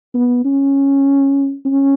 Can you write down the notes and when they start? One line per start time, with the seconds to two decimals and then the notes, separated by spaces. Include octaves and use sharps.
0.14 B3
0.45 C#4
1.66 C#4